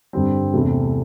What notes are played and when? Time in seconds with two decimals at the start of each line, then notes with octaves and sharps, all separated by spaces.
0.13 G2 D3 G3 C4
0.54 E2 C3 A3